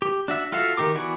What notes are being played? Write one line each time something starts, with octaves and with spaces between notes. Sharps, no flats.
G4
D4 F#4 E5
F4 F#4 A4 E5 F5
D#3 G4 A#4 D6
E3 B3 F#4 D5 G#5